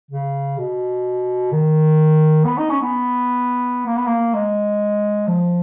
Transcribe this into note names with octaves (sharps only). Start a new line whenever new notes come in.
C#3
B2
D#3
B3
D#4
C#4
B3
A#3
B3
A#3
G#3
F3